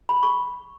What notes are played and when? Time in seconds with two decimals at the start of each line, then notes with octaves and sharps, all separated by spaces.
0.09 B5
0.23 C#6